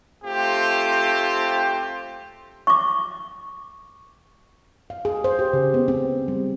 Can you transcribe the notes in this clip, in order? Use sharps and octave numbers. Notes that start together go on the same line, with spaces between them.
A3 C4 F4 G4
C#6 D6
F5
G#4
C5
G4
C#3
B3
C4
G3